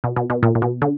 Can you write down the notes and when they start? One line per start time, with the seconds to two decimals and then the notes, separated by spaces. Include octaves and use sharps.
0.04 B2
0.16 B2
0.30 B2
0.43 A#2
0.55 A#2
0.62 B2
0.82 D3